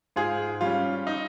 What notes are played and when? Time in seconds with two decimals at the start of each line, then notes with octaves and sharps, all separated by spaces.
0.16 G#2 F4 G#4
0.61 G3 C#4 F4
1.07 D#4